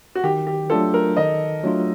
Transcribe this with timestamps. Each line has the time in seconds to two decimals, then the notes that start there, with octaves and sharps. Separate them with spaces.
0.15 F#4
0.24 D#3 G4
0.47 G4
0.70 F#3 A3 D4 F4 A4
0.94 A#4
1.17 D#3 D#5
1.63 F#3 A3 D4 F4